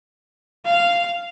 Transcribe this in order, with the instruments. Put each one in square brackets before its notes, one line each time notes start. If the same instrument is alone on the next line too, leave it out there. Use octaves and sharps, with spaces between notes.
[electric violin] F5